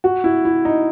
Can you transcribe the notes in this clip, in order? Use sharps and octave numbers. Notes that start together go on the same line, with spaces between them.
F#4
E4
E4
D#4